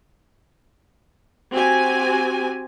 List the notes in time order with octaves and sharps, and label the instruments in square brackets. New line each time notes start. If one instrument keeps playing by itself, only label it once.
[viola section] C4 F#4 G4 G#5